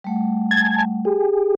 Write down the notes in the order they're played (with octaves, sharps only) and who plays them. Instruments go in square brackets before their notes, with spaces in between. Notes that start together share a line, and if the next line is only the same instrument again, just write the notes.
[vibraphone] G3 A3 F#5
[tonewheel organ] G#5 A5 G#6
G4 G#4